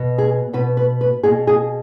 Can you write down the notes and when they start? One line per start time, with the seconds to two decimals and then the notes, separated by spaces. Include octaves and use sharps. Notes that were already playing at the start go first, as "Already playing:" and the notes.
Already playing: B2
0.18 G#4
0.53 B2 B4
0.77 B4
1.01 B4
1.23 B2 G#4
1.47 G#4